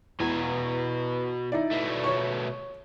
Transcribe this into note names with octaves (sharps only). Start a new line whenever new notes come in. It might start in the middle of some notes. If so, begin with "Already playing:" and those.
E2 B2 G#5
D#4 E4 D5
B2 A3
C#5 C#6